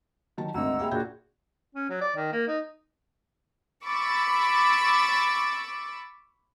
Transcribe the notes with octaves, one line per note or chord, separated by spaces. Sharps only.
D#3 F#3 A5
G#1 D2 C4 D#5 E5 F#5 A#5 E6
D#2 G#4 E5 F5 G5 B5
A#2 D4 F#4 G#4 G6
C#4
F#3
D5
D#3
A#3
D#4
B5 C#6 D6 E6 A6